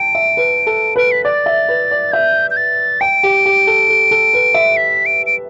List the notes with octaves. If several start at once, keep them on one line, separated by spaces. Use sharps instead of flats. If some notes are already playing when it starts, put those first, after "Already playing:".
Already playing: G5 A5 D7
E5
B4
A4
B4 D7
B6
D5 A6
E5
B4
D5
E5 G6
G6
A6
G5 D7
G4
G4
A4
A4
A4
B4
E5
B6
D7
D7